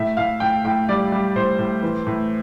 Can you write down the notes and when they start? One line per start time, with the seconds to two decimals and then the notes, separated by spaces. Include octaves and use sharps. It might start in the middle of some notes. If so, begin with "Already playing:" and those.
Already playing: A2 E5
0.17 A2 F5
0.40 A2 G5
0.65 A2 G5
0.89 G3 D5
1.12 G3
1.36 A2 C5
1.58 A2
1.82 E3
2.06 A2